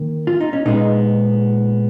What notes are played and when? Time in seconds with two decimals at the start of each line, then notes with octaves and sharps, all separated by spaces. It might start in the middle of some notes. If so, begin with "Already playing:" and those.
Already playing: D#3 A#3
0.27 F4
0.40 D#4
0.53 C#4
0.66 A#2 G#3 B3 D#4